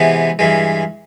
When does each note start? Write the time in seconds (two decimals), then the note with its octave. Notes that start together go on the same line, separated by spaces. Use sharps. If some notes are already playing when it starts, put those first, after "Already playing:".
Already playing: C3 E3 G#3 B3
0.39 G2 E3 G#3